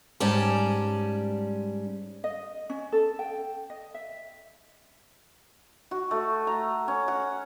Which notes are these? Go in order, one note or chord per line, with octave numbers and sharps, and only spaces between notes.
G#2 G3 C#4 D5 A5
D#5
C#4
A4
G5
D#5
E5
F#4
A3
A#5
C#4
F#5